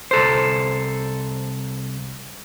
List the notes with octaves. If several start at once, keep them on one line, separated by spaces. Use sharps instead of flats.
C2 A4 C5